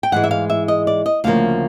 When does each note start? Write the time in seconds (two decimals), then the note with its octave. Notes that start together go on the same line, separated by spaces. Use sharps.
0.03 G5
0.12 G#2 E3 G#3 F#5
0.24 E5
0.31 F5
0.50 E5
0.68 D#5
0.87 D5
1.06 D#5
1.24 D2 C#3 F3 A#3 F5